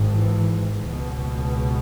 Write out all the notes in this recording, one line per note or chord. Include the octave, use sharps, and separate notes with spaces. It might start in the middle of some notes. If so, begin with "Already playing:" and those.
Already playing: G#1 G#2
E3
C#2 B2